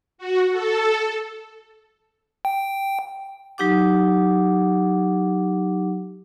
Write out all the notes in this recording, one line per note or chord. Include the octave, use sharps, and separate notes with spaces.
F#4
A4
G5
F#3 D#4 G4 F#5 D6